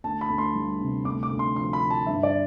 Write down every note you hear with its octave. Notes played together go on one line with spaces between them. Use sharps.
D2 A5
B5
D2
C6
G3
C3
D2 D6
D6
D2
C6
F3 C6
B5
D3
A5
G2 E5
D5